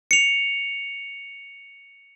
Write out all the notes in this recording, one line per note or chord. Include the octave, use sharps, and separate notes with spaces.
C#7 F7